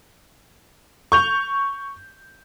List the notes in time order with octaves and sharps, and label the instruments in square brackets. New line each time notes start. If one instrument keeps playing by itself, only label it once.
[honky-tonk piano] C#6 G6 F7